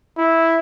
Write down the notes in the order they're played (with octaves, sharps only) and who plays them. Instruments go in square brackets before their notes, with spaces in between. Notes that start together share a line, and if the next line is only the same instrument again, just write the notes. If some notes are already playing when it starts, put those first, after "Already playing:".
[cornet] E4